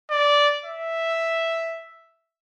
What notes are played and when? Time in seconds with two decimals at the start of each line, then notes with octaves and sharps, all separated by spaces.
0.10 D5
0.65 E5